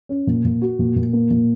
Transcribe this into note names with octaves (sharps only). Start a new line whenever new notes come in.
C#4
A#2
A#2
F#4
A#2
A#2
A#3
A#2